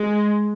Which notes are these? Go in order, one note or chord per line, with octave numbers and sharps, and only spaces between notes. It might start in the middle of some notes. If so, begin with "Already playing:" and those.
Already playing: G#3